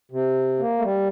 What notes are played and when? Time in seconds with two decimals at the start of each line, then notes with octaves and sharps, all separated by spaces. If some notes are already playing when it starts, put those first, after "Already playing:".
0.11 C3
0.59 A#3
0.78 A3
0.83 G3